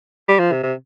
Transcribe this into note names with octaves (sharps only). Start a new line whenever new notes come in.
G3
F3
C3
C3